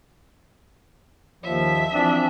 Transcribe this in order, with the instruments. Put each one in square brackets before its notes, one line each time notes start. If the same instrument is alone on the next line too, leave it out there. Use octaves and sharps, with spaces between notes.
[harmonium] D#2 F3 [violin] E5
[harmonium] E3 F3 C4 [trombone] D4